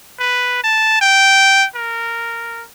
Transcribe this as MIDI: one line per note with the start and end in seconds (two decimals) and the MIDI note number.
0.19 0.59 71
0.63 1.00 81
1.01 1.66 79
1.75 2.63 70